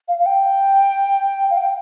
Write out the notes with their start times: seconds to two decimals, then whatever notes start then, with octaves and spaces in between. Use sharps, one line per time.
0.08 F5
0.19 F5
0.26 G5
1.50 F5
1.57 G5